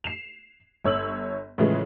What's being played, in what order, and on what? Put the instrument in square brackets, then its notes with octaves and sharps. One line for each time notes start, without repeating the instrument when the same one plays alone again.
[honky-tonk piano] C7 E7 F7
G1 C#5 E6 F#7
A2 C#3 E3 F3 G#3